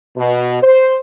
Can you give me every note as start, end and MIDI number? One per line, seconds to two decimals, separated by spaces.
0.17 0.60 47
0.63 0.98 72